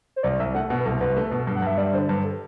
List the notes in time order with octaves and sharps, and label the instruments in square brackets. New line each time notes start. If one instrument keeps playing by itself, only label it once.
[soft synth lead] C5
[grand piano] C2 [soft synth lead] D5
[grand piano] C2 [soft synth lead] E5
[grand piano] A3 [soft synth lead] F#5
[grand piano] B2 [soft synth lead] F#5
[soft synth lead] B4
[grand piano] C2 [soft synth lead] A4
[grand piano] C2 [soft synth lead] B4
[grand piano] A3
B2
G2
[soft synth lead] F#5
[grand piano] G2 [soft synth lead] E5
[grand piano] G3 [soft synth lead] D5
[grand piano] D3 [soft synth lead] C5
[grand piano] G2 [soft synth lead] B4
[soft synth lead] A4